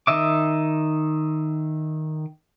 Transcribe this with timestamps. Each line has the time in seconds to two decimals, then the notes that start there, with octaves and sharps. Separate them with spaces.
0.07 D#3 D#5 E5 D6